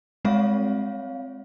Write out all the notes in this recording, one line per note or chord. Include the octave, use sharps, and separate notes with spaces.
G3 G#3 C4 C#5 E5 F5